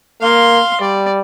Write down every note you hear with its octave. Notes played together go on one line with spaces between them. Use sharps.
A#3 F5 C6
G3 D5